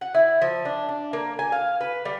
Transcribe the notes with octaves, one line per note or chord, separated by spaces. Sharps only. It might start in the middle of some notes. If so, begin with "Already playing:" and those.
F#5
E4
F3
D4
D4
A#3
G#5
F5
B4
G3